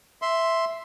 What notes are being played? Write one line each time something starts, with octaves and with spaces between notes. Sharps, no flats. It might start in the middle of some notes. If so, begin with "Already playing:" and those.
E5 C6